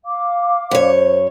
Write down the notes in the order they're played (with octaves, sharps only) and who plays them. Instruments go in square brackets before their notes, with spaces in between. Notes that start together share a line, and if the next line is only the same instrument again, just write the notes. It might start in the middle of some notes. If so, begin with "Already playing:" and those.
[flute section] F5 D6
[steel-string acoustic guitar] F#2 C#5 [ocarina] C5